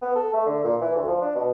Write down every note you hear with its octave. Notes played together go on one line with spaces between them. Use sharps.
B3
A4
A3
D3
A#2
E3
D2
F3
D4
B2